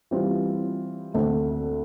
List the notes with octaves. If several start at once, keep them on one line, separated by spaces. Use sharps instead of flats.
E3 G3 C4 F4
D2 D3 A3 C4